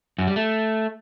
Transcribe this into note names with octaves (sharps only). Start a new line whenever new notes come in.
F#2
G3
A3